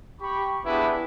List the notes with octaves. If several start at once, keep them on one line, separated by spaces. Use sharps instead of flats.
G4 B5 C#6
B3 D4 E4 G4 G#4 B4